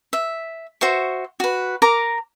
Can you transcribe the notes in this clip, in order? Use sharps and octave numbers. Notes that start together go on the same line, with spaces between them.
E5
F#4 C5 E5 C#6
F#4 B4
A#4 A#5 D6